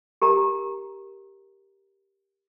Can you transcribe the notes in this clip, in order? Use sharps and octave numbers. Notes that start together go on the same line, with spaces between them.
G4 A#4 A#5